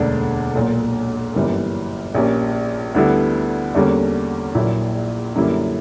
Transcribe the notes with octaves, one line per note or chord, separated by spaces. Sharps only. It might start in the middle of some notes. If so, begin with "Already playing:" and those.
Already playing: E1 D2 D3 A#3 D4
B1 A#2 A#3
G1 F#2 E3 G3 A#3
A#1 A#2 A#3 C#4 G4
D2 D3 G3 B3 E4
E2 D3 G3 A#3 C#4
A#1 A#2 F#3 A#3 E4
F#2 D3 G3 A#3 E4